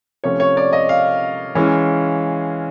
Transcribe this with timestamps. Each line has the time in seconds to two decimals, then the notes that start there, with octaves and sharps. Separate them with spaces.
0.24 C3 F3 A3 C#4 C#5
0.40 C#5
0.57 D5
0.73 D#5
0.89 F5
1.55 E3 G#3 C#4